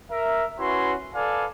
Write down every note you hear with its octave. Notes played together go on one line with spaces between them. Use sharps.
A#4 E5
C#4 E4 F#4 B4 C6
A4 B4 D5 F5 G#5